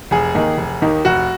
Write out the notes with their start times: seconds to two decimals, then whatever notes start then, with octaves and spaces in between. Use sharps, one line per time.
0.11 F1 G#4
0.35 D#2 D#3 A#3 D#4
0.57 F1
0.82 D#2 D#3 A#3 D#4
1.05 F1 F#4